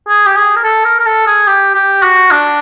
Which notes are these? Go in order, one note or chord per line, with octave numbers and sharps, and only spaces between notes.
G#4
G4
G#4
A#4
A4
A#4
A#4
A4
G#4
G4
G4
F#4
D4